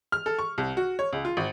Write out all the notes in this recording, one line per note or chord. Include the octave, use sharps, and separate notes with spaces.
F6
A4
C#6
C2
F#4
C#5
C#2
F4
G#1